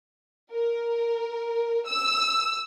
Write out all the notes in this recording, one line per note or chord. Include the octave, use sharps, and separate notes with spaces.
A#4
E6